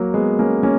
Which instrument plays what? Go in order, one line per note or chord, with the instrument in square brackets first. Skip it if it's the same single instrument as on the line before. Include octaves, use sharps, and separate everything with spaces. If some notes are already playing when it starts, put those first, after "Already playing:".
Already playing: [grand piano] F#3 A#3
G#3 B3
A#3 C#4
A#3 C#4